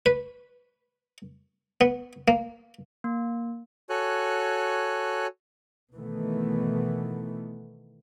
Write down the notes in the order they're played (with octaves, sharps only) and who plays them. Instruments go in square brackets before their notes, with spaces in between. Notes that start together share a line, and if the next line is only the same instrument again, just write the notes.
[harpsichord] B4
B3
A#3
[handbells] A#3
[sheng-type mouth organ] F#4 A4 C#5 G#5 F#6
[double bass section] B2 D#3 E3 A3 B3